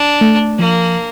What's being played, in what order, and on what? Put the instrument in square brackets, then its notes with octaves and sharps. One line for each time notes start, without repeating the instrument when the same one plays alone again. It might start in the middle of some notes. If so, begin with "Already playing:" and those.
Already playing: [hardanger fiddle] D4
[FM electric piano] A3
[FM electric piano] F3 [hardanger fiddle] A#3